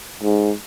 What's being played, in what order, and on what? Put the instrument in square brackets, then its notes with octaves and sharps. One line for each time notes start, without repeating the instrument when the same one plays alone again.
[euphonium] G#2